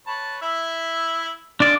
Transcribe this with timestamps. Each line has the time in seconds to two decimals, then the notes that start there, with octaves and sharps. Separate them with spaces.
0.07 B4 C#5 A5
0.42 E4 E5
1.60 G#3 D4 F4 D5